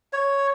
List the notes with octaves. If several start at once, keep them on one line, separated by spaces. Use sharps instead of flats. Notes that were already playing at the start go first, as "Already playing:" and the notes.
C#5